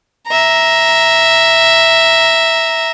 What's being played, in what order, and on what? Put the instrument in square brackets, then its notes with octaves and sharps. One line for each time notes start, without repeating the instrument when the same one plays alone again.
[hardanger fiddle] E5 A#5